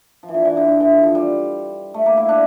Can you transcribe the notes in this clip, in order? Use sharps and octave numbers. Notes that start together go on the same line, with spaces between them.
F3
E3
D3
E3
D3
D3
E3
F3
F3
G3
A3
A#3
E4
D4